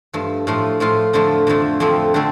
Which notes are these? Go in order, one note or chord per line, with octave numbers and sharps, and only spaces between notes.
G2 F3 A3
A2 F3 A3 F4
A2 F3 A3 F4
F2 D3 F3 A3
F2 D3 F3 A3
F2 D3 F3 A3 C4
D3 F3 A3 C4